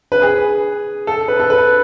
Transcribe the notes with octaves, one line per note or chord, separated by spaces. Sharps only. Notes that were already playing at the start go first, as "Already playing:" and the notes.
B4
G#4
A4
B4
A4
B4